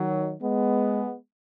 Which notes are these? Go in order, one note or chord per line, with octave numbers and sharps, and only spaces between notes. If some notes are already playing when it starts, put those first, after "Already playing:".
Already playing: D#3 F#3
G#3 B3